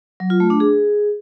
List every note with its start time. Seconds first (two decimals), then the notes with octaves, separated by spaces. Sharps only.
0.20 F#3
0.30 F4
0.40 A3
0.50 D4
0.60 G#4